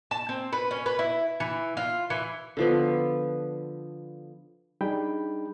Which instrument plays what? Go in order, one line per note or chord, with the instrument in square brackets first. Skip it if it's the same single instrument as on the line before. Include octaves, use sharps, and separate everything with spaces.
[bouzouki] A5
C4
B4
C#4
B4
E4
E3
F4
E3
[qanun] D3 F3 B3
[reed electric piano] G3 D4 D#4 G#4 G5 B5